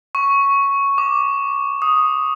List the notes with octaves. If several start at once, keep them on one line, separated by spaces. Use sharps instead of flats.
C#6
D6
D#6